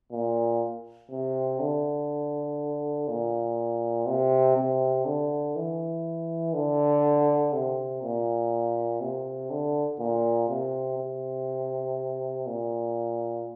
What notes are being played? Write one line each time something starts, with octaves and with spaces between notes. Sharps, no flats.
A#2
C3
D3
A#2
C3
C3
D3
E3
D3
C3
A#2
C3
D3
A#2
C3
C3
A#2